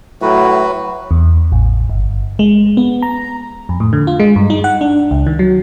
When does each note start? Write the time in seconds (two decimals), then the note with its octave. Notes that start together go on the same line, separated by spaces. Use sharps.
0.22 A2 F#3 F#4 B4
1.11 E2
1.52 A1
1.89 G1
2.39 G#3
2.77 B3
3.02 A#5
3.69 F2
3.80 A2
3.93 D3
4.07 F4
4.20 G#3
4.36 G2
4.50 D#4
4.64 F#5
4.81 D4
5.11 C#2
5.27 D#3
5.39 F#3